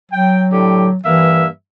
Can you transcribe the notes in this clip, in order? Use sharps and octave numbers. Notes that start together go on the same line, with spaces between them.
F#3 G5
A2 D3 G4
G2 E3 A#3 E5